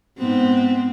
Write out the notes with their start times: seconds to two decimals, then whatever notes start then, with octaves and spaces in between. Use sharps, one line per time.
0.18 G#2 B3 C4